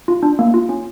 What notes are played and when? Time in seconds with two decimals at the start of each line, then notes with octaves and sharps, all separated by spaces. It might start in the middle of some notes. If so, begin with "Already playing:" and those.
0.08 F4
0.23 D4
0.39 A#3
0.54 F4
0.69 C#4